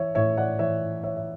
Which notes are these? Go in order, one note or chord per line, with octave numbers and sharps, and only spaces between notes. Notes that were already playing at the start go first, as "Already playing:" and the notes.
Already playing: E3 C#5 E5
A2 C#5 E5
D5 F#5
E3 C#5 E5
E3 C#5 E5
E5